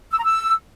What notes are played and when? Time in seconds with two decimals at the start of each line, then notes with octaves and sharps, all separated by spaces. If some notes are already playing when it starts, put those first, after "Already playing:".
0.12 E6
0.18 A#5
0.24 E6